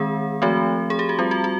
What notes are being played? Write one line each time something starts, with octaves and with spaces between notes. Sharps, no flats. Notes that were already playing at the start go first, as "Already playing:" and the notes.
Already playing: D#3 G#3 C4 G#4
F3 A3 C4 F#4
G#4
G4
F#4
G3 C4 F4
F#4
F#4